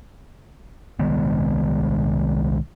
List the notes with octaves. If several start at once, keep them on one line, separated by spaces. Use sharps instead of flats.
C2 D#3 G#3 B3